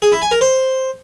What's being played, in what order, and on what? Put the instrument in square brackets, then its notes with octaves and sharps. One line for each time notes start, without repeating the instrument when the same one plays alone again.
[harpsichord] G#4
E4
G#5
A#4
C5